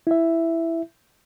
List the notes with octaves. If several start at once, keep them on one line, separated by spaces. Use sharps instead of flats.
E4 E5